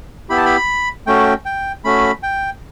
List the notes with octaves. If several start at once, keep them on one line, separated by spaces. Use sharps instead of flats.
B3 E4 G4 B5
A5
B5
A3 C#4 F#4 G5
G5
A3 C#4 F#4 B5
G5